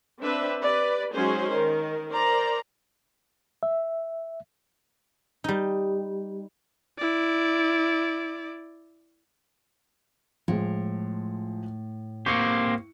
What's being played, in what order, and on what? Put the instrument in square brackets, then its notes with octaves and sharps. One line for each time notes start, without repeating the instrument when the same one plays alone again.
[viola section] C4 D4 B4 E5
G4 B4 D5
F#3 G#3 C#4 D#4 G#4 C5
D#3 A#4
A#4 C5 D5 A#5
[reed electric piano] E5
[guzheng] G3 D#4
[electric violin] E4 D5
[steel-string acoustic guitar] A2 [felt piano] F3 G#3
[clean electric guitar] A#3 C4 G4 [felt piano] C#6 C#7